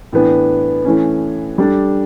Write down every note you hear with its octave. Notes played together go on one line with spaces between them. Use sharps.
A2 E3 B3 D4
E3 A3 C#4
G3 D4 A4